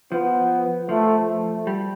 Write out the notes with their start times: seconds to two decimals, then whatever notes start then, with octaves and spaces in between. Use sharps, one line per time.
0.12 F3 B3
0.89 F3 A3
1.28 A3
1.67 G3